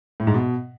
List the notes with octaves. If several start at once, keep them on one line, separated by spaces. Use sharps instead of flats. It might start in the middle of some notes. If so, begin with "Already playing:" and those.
A2
G#2
B2